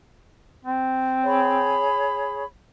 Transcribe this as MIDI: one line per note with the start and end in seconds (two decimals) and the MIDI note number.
0.65 1.89 60
1.24 2.44 68
1.24 2.44 73
1.24 2.44 83